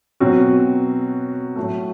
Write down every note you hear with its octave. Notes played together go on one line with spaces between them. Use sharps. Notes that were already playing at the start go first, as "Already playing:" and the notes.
B2 F#3 C4 F#4
A2 F#3 A3